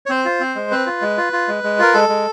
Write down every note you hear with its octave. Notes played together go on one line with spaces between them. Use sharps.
C#5
C4 C5
F4
C4
G#3
C4 B4
F4
G#3
F4
F4
G#3
G#3
F4 A#4
G#3 A4
G#3